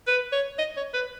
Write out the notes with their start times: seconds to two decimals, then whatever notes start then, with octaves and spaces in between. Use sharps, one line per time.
0.07 B4
0.32 C#5
0.58 D#5
0.77 C#5
0.94 B4